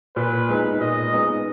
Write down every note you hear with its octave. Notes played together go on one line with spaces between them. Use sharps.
A#2 B4
G#3 B3 D#4
A#2 D#5
G#3 B3 D#4